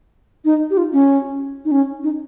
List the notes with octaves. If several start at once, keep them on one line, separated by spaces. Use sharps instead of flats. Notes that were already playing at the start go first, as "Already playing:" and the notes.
D#4
G4
F4
C#4
D#4
C#4
D#4